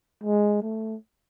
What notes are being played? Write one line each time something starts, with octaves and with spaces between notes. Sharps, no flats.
G#3
A3